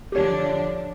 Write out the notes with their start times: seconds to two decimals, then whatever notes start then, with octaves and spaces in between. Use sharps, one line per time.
0.12 D3 F3 D4 G4 C#5